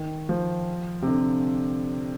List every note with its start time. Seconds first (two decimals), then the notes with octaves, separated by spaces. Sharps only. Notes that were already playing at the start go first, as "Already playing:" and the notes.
Already playing: D#3
0.29 F3
1.02 C3
1.07 D3